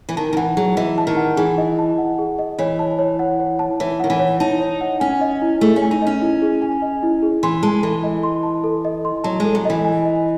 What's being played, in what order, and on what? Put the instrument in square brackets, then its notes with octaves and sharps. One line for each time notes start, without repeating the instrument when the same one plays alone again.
[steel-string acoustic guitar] E3
[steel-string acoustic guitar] D#3 [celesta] A5
[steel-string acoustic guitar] D#3
[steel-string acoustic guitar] E3 [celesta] F#5
[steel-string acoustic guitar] F#3 [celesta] G#4
[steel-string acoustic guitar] E3 [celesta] D#5
[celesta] A5
[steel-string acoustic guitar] D#3
[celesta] F#5
[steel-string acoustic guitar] E3 [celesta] G#4
[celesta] D#5
A5
F#5
G#4
D#5
[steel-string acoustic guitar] E3 [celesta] C#5
[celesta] A5
C#5
F#5
C#5
A5
[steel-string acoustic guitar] E3 [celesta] C#5
[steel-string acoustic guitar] D#3 [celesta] F#5
[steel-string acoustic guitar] E3
[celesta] C#5
[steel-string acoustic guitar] D#4 [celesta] A5
[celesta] C#5
F#5
[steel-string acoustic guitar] C#4 [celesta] G#5
[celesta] D#5
E4
[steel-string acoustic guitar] A3 [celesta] G#4
[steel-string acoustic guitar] C#4
[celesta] G#5
[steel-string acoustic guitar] D#4
[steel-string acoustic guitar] C#4 [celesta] D#5
[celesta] E4
G#4
G#5
D#5
E4
G#4
[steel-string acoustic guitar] E3 [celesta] C6
[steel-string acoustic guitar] G#3 [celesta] A5
[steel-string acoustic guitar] E3 [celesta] A4
[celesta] D#5
C6
A5
A4
D#5
C6
[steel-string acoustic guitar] F#3 [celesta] A5
[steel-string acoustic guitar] G#3 [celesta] A4
[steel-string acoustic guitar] F#3
[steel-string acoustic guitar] E3 [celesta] D#5
[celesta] G#5
D#5